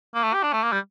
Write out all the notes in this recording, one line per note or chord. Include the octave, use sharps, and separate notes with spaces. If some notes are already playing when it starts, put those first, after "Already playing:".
A#3
A3
G4
D4
A3
A#3
G3